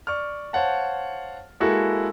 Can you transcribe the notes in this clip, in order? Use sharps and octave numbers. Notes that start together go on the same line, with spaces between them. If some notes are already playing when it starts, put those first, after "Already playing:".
D5 C#6 F6
C5 C#5 F5 F#5 A5
G#3 A#3 E4 F#4 G#4 A4